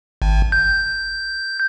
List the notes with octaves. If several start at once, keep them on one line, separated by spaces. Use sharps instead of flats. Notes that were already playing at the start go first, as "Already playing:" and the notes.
G#1
G6